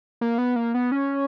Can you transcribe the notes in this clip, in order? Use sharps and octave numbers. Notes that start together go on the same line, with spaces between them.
A#3
B3
A#3
B3
C#4